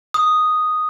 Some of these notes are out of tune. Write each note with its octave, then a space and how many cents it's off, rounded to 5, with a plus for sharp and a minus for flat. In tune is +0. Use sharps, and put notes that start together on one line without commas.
D#6 -5